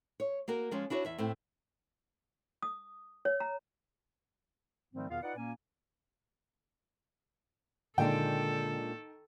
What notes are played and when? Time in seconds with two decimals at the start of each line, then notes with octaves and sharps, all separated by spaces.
0.20 C#5
0.48 A#3 F#4 A#4
0.71 F3 G#3 C#4 F4
0.90 D4 E4 F#4 B4 C#5
1.05 E2 E5
1.18 A2 A3 C4
2.62 D#6
3.25 C#5
3.40 A#5
4.93 G#2 D#3 F3 G3 A3 C4
5.09 E2 B2 D#3 B3 F4 F5
5.22 D#4 F4 B4 D5 F#5
5.36 A#2 A#3 C#4 G#5
7.98 A#2 D3 D#3 G#3 D4 A4 G5